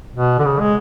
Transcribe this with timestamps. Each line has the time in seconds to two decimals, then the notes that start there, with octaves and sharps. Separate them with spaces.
0.14 B2
0.39 D3
0.45 C#3
0.59 G#3